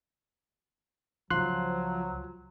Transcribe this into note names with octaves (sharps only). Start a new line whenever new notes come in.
C#2 F3 F#3 C6 F#6